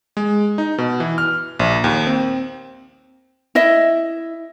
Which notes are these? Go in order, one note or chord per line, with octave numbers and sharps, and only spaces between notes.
G#3
D#4
B2
E3
F6
A#1
D#2
C4
E4 D#5 E5